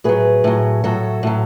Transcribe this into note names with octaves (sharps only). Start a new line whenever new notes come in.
A2 F#3 G#4 B4
A2 F#3
A2 F#3 F#4 A4
A2 F#3